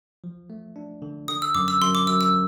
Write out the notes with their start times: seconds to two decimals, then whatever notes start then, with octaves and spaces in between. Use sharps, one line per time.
0.24 F3
0.50 A3
0.76 D4
1.02 D3
1.28 D3 D#6
1.42 E6
1.55 F#2 D6
1.68 E6
1.81 F#2 C6
1.95 D6
2.07 F#2 E6
2.21 E6